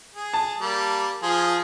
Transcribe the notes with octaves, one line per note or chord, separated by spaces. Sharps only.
G#4
A5
G3 A#3
F3 F4 G#4